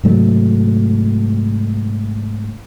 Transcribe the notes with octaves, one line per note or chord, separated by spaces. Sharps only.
G#2 C3 F#3 A3